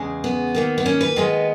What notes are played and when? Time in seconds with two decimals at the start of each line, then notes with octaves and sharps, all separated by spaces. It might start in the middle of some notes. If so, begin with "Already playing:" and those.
Already playing: E2 C#3 G#3
0.24 B3
0.55 D#2 D#3 A#3
0.78 B3
0.86 C#4
1.01 B4
1.16 D#2 D#3 G#3 B3